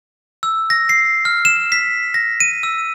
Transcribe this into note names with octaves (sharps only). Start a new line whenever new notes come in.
E6
A#6
C7
F6
E7
B6
A#6
D#7
E6